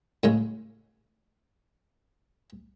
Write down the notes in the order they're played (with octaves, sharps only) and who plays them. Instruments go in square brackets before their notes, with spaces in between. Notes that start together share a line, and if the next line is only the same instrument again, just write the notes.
[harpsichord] A2 C#3 G#3